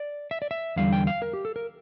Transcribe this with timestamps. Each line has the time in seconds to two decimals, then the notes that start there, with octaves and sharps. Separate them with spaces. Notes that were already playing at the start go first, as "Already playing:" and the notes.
Already playing: D5
0.31 E5
0.42 D5
0.51 E5
0.76 E2 D3 G3 F5
0.93 G5
1.07 F5
1.22 A#4
1.33 G4
1.45 A4
1.56 A#4